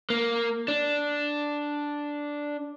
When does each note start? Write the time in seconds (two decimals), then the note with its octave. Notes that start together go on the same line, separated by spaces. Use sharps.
0.10 A#3
0.68 D4